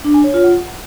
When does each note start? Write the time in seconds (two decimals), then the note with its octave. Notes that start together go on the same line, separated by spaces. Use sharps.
0.04 D4
0.14 G#5
0.24 C#5
0.34 F4
0.44 F#5